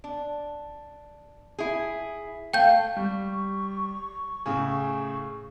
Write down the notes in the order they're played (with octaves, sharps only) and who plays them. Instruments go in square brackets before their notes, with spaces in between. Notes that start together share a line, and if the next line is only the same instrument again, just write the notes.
[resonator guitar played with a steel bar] D4
E4 G#4
[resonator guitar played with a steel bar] A3 [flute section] F5 [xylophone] G5 G6
[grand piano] G3 [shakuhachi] C#6
[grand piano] A2 C#3 G#4